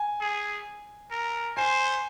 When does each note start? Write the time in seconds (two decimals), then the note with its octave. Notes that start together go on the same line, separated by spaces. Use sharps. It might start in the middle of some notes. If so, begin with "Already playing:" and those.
Already playing: G#5
0.21 G#4
1.11 A#4
1.57 C5 G#5